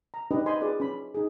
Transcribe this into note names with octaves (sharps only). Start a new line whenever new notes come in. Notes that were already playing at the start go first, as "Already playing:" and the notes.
A#5
D4 D#4 G4 B4 D#5
C5 D#5 G#5 B5 C6
F4 G#4 B4 D5
C#4 B5
D#4 G#4